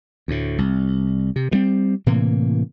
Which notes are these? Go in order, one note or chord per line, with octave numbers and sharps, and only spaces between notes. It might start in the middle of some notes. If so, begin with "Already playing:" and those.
D2 A2
C2
C3
G2 G3 C4
A2 C3 E3 A#3